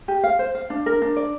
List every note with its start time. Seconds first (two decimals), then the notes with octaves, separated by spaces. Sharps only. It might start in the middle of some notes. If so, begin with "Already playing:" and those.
0.08 G4
0.23 F5
0.39 C5
0.55 F5
0.70 D4
0.86 A#4
1.02 D4
1.16 D5